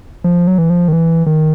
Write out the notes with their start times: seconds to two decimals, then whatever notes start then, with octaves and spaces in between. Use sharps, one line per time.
0.24 F3
0.47 F#3
0.58 E3
0.70 F3
0.88 D#3
0.92 E3
1.26 D#3